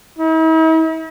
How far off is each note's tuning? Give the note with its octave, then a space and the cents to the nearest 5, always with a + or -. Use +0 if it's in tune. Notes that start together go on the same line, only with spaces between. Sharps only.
E4 -45